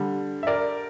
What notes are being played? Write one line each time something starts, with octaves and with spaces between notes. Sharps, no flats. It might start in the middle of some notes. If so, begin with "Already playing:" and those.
Already playing: D3 G3
E5
A#4 D5